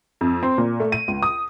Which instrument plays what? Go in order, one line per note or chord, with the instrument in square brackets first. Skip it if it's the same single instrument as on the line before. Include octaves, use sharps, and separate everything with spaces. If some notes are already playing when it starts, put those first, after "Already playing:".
[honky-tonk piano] F2
C4
A#2
A3
D#7
C#2
D#6